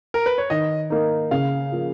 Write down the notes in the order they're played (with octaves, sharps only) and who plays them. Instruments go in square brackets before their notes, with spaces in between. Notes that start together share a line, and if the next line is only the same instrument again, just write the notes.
[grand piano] A#4
B4
C#5
[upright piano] D#3 [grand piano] D#5
[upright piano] A#3 D#4
[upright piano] C#3 [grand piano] F5
[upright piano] F3 A#3